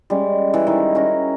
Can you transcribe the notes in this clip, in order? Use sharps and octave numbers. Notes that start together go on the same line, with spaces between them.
G3 G#3 C#4
E3
D#3 E4
C#4 F#4 A#4